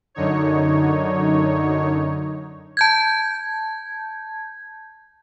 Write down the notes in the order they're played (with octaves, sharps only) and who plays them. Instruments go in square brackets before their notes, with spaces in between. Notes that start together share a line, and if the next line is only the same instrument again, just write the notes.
[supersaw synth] F#2 D3 D#4 C#5
[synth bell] A5 G6 G#6